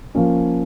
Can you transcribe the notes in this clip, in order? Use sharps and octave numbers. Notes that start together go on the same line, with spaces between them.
F3 A#3 C#4